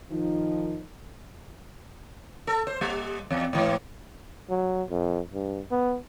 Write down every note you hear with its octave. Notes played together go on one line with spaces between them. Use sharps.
D#3 F3 D#4
A4
C5
G3
E2
G#2 E3
F#3
F2
G2
B3